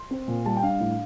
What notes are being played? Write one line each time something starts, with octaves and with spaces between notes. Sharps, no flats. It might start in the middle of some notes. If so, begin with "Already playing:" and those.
Already playing: C6
C4
A#2
G3 A5
G5
D4 F5
A2